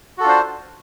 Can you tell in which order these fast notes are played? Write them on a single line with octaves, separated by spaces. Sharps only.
F#4 A4 F4 D4 C5